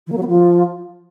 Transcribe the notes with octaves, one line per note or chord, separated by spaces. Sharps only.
E3
A#3
F#3
B3
F3